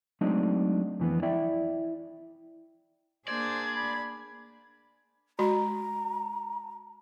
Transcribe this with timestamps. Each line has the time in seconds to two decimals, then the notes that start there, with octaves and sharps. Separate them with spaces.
0.21 F#3 G#3 A3 C4 D4 D#4
1.00 F2 E3 B3
1.22 E4 D5 E5 G5
3.28 A#3 D4 G#4 C5 D5 G#6
3.76 B5
5.39 G#3 F#4 A#5 B5